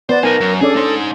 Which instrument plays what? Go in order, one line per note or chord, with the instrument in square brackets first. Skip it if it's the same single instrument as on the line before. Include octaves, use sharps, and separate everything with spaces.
[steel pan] B3 B4 [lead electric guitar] C5 [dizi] D5
[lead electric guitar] B3 D#4 [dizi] A#4 [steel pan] G#5
[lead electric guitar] F#2
[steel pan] C#4 D4 D5 [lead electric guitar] G#4 [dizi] A4
[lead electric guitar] D#4 C5